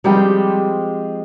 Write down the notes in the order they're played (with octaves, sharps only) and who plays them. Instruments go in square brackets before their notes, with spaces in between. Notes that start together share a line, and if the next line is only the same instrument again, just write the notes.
[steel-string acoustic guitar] F3 G#3 C4 G4 [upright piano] G3